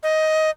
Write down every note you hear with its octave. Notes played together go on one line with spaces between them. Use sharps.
D#5